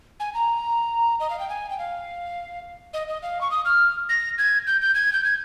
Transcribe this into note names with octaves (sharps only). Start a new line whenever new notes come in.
G#5
A#5
D#5
F5
G5
G#5
G5
F5
D#5
D#5
F5
C#6
D#6
F6
A#6
G#6
G6
G6
G#6
G6
G#6